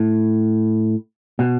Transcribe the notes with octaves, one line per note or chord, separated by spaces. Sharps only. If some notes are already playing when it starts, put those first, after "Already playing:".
Already playing: A2
B2